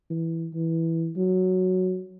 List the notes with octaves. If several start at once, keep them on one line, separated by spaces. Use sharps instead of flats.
E3
E3
F#3